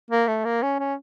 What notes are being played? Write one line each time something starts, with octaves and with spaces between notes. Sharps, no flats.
A#3
A3
A#3
C#4
C#4